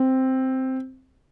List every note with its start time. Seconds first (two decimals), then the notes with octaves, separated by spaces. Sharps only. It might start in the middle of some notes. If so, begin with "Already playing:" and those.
Already playing: C4